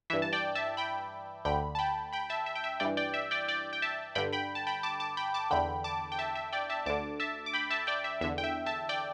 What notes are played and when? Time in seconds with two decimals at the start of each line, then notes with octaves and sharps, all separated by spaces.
0.10 G2 E3 E5
0.22 A5
0.33 D5 G5
0.55 E5 A5
0.77 G5 B5
1.45 D2 D3 G5 B5
1.75 A5
1.79 G5 B5
2.13 G5 B5
2.30 E5 A5
2.46 E5
2.55 G5
2.64 E5
2.80 G2 E3 D5 G5
2.97 D5 G5
3.14 E5
3.31 D5 G5
3.48 D5 G5
3.73 G5
3.82 E5 A5
4.15 G2 D3 G5 B5
4.33 G5 B5
4.55 A5
4.67 G5 B5
4.83 A5 D6
5.00 A5 D6
5.17 G5 B5
5.34 A5 D6
5.51 E2 D3 G5 B5
5.84 A5 D6
6.12 G5
6.19 E5 A5
6.35 E5
6.53 D5 G5
6.70 E5 A5
6.86 D2 D3 A5 D6
7.20 E5 A5
7.46 D6
7.53 G5 B5
7.70 E5 A5
7.87 D5 G5
8.04 E5
8.21 E2 E5
8.24 D3
8.38 G5
8.44 E5
8.66 E5 A5
8.89 D5 G5